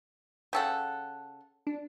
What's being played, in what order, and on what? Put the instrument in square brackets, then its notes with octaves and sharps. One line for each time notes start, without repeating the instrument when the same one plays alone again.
[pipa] C#3 A4 F#5 [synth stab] G5
[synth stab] D4